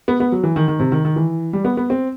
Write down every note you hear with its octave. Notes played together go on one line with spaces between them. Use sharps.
B3
B3
F#3
E3
D#3
D#3
C3
D#3
D#3
E3
G3
B3
B3
C4